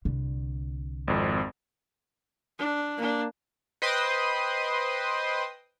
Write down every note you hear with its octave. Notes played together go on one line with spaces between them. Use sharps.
C2 D3
G#1 F2
D4
A#3 D4
B4 C5 D#5 G5 C6 D#6